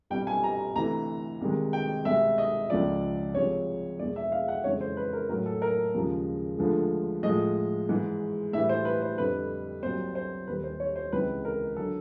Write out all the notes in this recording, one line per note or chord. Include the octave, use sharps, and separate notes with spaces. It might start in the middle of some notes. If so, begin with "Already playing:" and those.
C2 B2 G3 G5
G#5
A#5
D2 C3 E3 A#5
C2 C3 D#3 G#3
G5
C2 B2 G#3 E5
D#5
C#2 C#3 F3 D5
C2 C3 F3 G#3 C#5
E2 B2 G#3 D5
E5
F5
F#5
F2 C#3 E3 G#3 C#5
C5
B4
A#4
A2 F#3 A#4
A4
A#4
D#2 C#3 F3 G#3
D2 D3 F3 G#3
A2 F3 G#3 D#5
G#2 E3 G#3
A2 E3 G3 E5
C5
B4
C5
F2 D3 G3 B4
C2 A#2 F#3 C5
C5
D#2 D#3 G3 B4
C5
C#5
C5
C#2 C3 E3 G#3 B4
A#4
D3 F#3 A4